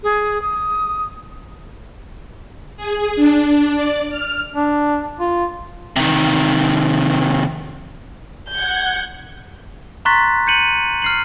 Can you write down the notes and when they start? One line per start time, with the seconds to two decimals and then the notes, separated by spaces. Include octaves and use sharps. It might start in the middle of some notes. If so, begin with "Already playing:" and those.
0.03 G#4
0.42 D#6
2.77 G#4
3.16 D4
3.77 D5
4.10 F6
4.54 D4
5.20 F4
5.96 C3 D#3
8.49 F#5 G6 G#6
10.05 A#5 C6 C#6 F#6 A6 B6
10.47 G6 C#7 D#7 F#7
11.02 F6 C7 F#7